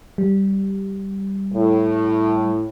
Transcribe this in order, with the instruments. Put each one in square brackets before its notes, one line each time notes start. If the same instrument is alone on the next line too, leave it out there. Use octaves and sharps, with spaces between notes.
[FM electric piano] G3
[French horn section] A2